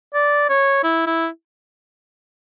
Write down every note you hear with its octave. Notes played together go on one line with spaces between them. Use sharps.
D5
C#5
E4
E4